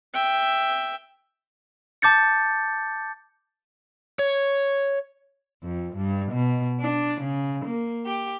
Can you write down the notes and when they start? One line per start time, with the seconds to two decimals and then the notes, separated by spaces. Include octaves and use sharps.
0.14 E5 G5
2.02 A5 D6 G6 A6 C#7
4.19 C#5
5.62 F2
5.95 G2
6.31 B2
6.80 D4
7.20 C#3
7.64 A#3
8.06 G4